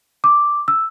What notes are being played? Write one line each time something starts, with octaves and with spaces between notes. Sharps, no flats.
D6
E6